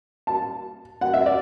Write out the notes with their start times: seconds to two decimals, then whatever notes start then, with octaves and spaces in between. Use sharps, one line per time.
0.27 A5
1.01 F#5
1.14 E5
1.26 D5